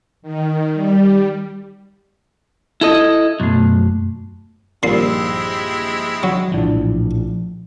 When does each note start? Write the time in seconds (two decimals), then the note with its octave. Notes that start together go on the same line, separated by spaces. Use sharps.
0.22 D#3
0.72 G3
2.81 E4 A4 D#5
3.40 B1 F#2 A3
4.83 A#1 G2 A#2 D#3 G#3 C4 E4 C6
6.23 F#3
6.52 A#1 A2 E3 F3 D4